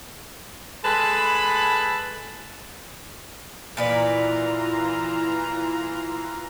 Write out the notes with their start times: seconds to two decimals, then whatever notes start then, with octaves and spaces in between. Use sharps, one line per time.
0.83 G#3 A4 B4 A5 B5
3.77 A#2 E3 F4 B4 D5 A#5